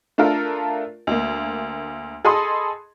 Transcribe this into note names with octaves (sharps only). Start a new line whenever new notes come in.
A3 D4 F4 A4 A#4
D2 A#3
G#4 A4 D#5 B5 C6 D#6